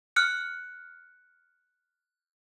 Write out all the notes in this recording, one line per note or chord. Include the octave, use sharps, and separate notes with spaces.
F6 F#6 C#7